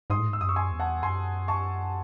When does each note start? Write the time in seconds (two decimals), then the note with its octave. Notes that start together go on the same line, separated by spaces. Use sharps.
0.10 G#2 C6 D#6
0.19 A2
0.28 G#2 E6
0.41 F#2 D#6
0.49 C#6 E6
0.56 G#5 C6
0.71 E2
0.80 F#5 A5
1.03 F#2 G#5 C6
1.48 A5 C#6